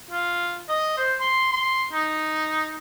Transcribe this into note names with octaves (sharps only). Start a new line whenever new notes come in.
F4
D#5
C5
C6
C6
D#4